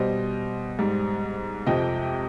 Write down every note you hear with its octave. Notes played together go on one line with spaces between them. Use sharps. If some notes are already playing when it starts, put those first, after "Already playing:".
Already playing: B2 G3 C5 D#5
G#2 G3
F2 C3 F3 D#5 G5